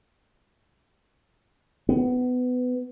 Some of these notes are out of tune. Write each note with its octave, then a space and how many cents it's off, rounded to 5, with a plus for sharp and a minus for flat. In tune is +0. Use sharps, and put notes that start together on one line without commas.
B3 +20